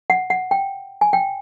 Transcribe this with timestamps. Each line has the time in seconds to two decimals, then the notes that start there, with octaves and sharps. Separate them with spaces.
0.10 F#5
0.30 F#5
0.51 G5
1.01 G#5
1.13 G5